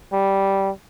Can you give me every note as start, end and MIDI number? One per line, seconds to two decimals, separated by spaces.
0.12 0.70 55